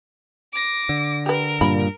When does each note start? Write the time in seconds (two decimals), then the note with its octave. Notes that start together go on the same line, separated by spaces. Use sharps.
0.52 D6 A#6
0.89 D3
1.26 G4 A#4 B4
1.61 G2 A#2 B5